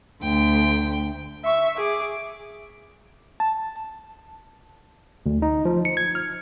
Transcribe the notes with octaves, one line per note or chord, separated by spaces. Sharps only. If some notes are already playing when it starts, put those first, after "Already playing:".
D2 G5
E5 C#6
G#4 D6
A5
D2
D#4
F3
C#7
G#6
F6